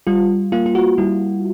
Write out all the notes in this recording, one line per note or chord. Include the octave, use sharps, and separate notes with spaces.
G3 F4
A#3 F4
F4
F#4
G3 E4